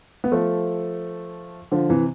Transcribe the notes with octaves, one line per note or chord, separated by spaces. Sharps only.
B3
F3 A3
D3 F3
C3 E3